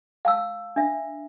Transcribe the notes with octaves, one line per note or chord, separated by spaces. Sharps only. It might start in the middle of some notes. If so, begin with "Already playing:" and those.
F5 A5 E6
D4 E5